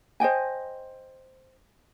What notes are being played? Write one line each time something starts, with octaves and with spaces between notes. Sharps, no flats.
C5 D#5 G5 G#5